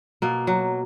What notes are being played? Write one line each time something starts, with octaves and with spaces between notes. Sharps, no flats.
B2 A#3
F#3